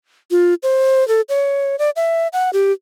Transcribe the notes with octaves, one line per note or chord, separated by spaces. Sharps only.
F4
C5
A4
C#5
D5
E5
F#5
G4